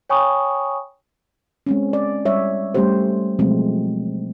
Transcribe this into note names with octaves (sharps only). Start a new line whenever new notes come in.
C#5 G5 G#5 B5 C#6 D#6
G#3 C4 C#4
D5
G3 C#5 E5
G3 A3 C#4 G4 C5
B2 F3 F#3 G#3 A3 C4